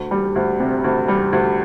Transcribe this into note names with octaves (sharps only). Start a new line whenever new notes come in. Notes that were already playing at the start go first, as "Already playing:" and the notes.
Already playing: D2
G3
D2
C3
D2
G3
D2